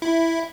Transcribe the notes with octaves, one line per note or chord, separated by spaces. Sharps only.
E4